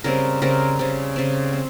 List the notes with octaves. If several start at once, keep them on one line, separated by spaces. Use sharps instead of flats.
C#3 G3 C4 A#4
C#3 G3 C4 A#4
C#3 G3 C4
C#3 G3 C4
C4